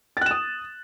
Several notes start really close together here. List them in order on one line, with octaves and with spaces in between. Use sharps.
A6 F#6 E7 D#6